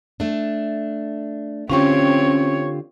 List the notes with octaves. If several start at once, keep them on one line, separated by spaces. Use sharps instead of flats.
A3 D4
D3 C4 C#4 F4 G4 C#5